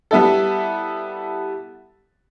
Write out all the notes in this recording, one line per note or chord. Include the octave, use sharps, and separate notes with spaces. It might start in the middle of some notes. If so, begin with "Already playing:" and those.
G3 B3 E4 A4